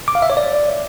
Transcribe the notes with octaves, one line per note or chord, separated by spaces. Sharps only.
D6
F5
E5
C#5
D5